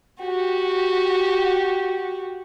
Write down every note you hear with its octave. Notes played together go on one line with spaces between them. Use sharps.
F#4 G4